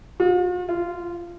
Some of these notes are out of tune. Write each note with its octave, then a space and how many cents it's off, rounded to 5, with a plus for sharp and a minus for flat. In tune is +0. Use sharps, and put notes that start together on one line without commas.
F4 +45
F4 -15